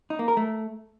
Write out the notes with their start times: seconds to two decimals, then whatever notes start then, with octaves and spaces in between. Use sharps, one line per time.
0.10 D#4
0.19 A#3
0.28 A#4
0.37 A3